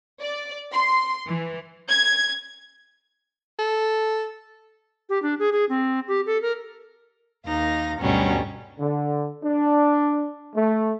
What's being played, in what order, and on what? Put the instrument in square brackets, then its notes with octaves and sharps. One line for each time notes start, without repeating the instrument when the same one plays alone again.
[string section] D5
C6
E3
[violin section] G#6
[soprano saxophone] A4
[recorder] G4
D4
G#4
G#4
C4
G4
A4
A#4
[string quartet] D#2 D#4 F5 A#6
D2 G2 B2 F#3 G3 C#4
[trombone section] D3
D4
A3